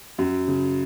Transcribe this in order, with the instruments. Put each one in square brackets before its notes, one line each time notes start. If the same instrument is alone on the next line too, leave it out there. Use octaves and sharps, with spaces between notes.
[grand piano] F#2
C#3